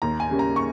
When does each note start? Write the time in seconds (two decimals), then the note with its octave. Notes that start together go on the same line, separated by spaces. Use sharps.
0.02 D#2 A#5
0.20 G#5
0.30 C#3 G3 A#3 C#4
0.39 A#5
0.56 C#6